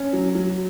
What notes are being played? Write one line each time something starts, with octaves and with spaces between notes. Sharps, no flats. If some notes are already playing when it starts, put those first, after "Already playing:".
Already playing: C#4
F#3
F#3